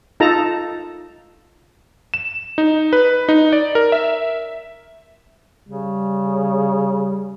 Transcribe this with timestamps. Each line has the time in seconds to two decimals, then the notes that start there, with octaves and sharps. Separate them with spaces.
0.20 D#4 F4 A4 A5 A#5
2.14 E7
2.58 D#4
2.93 B4
3.29 D#4
3.52 D5
3.75 A#4
3.92 E5
5.69 C#3 G3